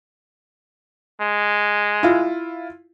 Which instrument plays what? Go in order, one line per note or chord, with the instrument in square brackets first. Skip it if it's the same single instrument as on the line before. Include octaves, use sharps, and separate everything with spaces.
[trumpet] G#3
[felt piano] E4 F4